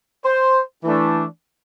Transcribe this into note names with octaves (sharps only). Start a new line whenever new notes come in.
C5
E3 A3 D4